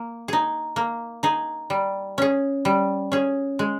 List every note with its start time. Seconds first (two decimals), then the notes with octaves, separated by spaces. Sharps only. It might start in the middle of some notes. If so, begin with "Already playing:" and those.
Already playing: A#3
0.28 D#4 G#4
0.76 A#3
1.23 D#4 G#4
1.70 G3
2.18 C#4 G#4
2.65 G3
3.12 C#4 G#4
3.59 G#3